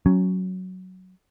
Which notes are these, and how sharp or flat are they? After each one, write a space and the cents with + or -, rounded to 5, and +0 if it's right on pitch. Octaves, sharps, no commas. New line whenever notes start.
F#3 +0 C#4 +0